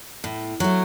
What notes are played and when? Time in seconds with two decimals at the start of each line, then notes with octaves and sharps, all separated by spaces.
0.24 A2
0.60 F#3 A3